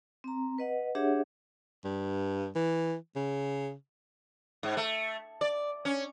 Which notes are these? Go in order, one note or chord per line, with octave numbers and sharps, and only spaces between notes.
C4 A#5
B4 D#5 F#5
D4 G4 G#4 C#5 E5 F#5
G2
E3
C#3
G#2
A3
D5
C#4